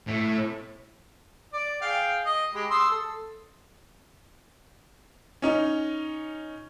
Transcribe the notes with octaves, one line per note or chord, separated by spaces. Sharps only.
A2
D5
G#4 F5 G5
D#5
G#3 G4 B5
C6 D#6 E6
A4
C#4 D#4